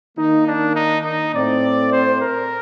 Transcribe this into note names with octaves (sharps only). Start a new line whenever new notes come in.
D#3 A#3 D#4
D4
D#4
D#4
A2 A3 C4 D5
C5
A#4